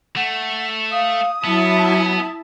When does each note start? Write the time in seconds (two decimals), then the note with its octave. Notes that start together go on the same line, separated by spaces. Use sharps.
0.16 A3 F#5
0.92 F5 D#6
1.44 F#3 B3 E4 E5 A5